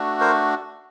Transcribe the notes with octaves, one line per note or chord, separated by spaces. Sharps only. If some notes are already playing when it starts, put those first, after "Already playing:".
Already playing: A3 D4 F#4
A#4 C5